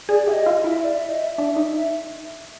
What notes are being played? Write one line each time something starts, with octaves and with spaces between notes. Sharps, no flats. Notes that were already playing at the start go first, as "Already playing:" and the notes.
G#4 D5
G4 E5
D#5
F4
E4 E5
D5
E5
D#5
E5
D4
D#4